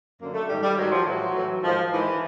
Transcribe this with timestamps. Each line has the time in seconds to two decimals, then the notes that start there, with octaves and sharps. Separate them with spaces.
0.19 F#2 D3 A#3
0.34 A3
0.48 G#2 D#3 G3
0.62 G3
0.77 G#2 D#3 F#3
0.91 F3
1.05 A2 E3 F#3
1.34 A2 E3
1.62 G#2 D#3 F3
1.91 G#2 D#3 E3